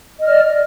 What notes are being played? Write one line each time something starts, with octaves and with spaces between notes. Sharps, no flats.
D5 D#5 F6